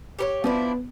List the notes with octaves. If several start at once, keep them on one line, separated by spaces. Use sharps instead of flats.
G4 A#4 C#5
F3 B3 D4 E4